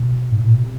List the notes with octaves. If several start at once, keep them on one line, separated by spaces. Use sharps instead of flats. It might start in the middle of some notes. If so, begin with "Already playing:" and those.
Already playing: B2
G#2
A2
A#2
B2
C3